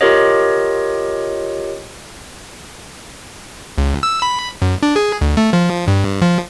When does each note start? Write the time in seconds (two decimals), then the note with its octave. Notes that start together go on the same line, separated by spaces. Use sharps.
0.01 F4 G4 A#4 C#5 D#5
3.78 C#2
4.03 E6
4.22 B5
4.62 F#2
4.83 D4
4.96 G#4
5.21 D2
5.37 A3
5.53 F3
5.88 G2
6.22 F3